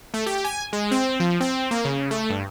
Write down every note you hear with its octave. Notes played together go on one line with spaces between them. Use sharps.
A3
G4
G#5
G#3
C4
F3
C4
A#3
C#3
A3
G2